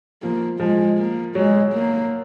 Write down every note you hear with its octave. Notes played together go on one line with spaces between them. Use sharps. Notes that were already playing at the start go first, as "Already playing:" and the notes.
F3 A#3
F3 G#3
A#3
F#3 G#3
A#3